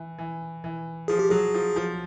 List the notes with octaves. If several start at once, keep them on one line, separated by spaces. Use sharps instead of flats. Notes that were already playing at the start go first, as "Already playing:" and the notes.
Already playing: E3
E3
E3
F3 G#4
G4
F#3 G#4
F3
F3